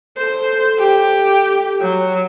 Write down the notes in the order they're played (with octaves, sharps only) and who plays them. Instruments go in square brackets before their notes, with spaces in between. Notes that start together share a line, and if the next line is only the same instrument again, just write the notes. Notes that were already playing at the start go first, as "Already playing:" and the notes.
[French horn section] A4 [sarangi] C5
[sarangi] G4
F#3